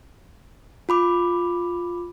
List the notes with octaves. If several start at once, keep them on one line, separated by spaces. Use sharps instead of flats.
F4 B5 D6